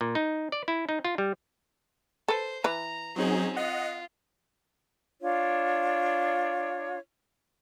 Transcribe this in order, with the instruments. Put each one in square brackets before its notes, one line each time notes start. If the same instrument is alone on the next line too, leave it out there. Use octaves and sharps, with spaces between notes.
[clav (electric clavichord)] A#2
D#4
D5
E4
D#4
F4
G3
[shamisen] A4 B4 [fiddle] C5
[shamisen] E3 B4 [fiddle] A#5
[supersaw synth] F#3 D#4 G#4 [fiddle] C4 C#4
[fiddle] F4 [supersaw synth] D#5 F#5
[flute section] D4 F4 C#5